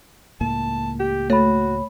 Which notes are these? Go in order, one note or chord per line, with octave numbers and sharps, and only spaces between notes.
C#2 A2 A#3 A5
G4
A3 F#4 C#5 B5